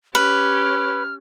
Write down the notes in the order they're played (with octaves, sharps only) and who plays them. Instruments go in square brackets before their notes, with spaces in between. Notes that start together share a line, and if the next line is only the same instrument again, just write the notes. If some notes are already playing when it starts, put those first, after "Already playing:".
[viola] C#4 G4 [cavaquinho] B4 [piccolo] F6